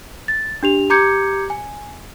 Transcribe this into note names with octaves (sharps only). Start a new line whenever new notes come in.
A6
D4 G4 F7
G4 A#5 D6 G6 G#6 C#7
G#5